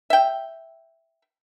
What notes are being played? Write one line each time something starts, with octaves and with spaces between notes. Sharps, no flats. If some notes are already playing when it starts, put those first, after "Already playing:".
E5 G5